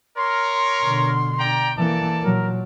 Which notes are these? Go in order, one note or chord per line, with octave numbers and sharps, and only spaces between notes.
A#4 C#5 C6
B2 D3
D5 G5 A#5
E3 A#3 A4 D5 A5
A#2 F#3 A#4